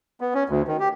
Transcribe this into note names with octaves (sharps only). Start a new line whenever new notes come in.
B3
C#4
D2
D#3
G4